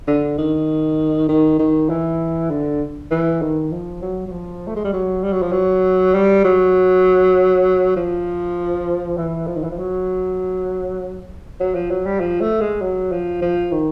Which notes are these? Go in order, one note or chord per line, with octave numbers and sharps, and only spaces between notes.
D3
D#3
D#3
D#3
E3
D3
E3
D#3
F3
F#3
F#3
F3
A3
G#3
G3
F#3
G3
F#3
F3
F#3
G3
F#3
F3
E3
F3
D#3
E3
F3
F#3
F#3
F3
F#3
G3
F3
A3
G#3
F#3
F3
F3
D#3